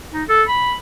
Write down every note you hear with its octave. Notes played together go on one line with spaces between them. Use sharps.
D#4
A4
B5